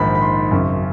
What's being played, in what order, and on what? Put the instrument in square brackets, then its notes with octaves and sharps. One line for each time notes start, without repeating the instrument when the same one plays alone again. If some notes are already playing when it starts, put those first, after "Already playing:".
Already playing: [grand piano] A#1 G#2 D#3 B5
B5
C6
G#1 F#2 C#3